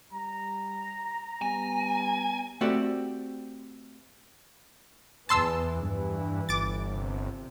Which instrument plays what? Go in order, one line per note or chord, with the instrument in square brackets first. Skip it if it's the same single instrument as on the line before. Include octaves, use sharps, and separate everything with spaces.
[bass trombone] G3 [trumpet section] A#5
[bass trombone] G3 [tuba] B3 [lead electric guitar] G#5
[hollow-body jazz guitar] A3 C4 F#4 G4 D5
[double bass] E2 E3 [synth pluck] A5 C6 E6
[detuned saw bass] G2 [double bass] E3
[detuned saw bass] G1 [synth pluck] D6 A6
[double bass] C3